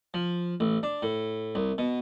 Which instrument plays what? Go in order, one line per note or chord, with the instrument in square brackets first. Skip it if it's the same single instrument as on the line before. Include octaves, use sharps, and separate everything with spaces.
[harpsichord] F3
A1
D4
A2
C2
B2